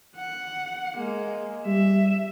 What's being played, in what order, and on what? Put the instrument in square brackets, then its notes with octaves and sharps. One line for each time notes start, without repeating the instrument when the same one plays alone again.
[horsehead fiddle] F#5
G#3 A#3
[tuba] G3 [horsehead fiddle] E5